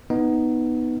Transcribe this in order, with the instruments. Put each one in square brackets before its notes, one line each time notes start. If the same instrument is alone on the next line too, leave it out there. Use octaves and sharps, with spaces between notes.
[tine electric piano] B3 D#4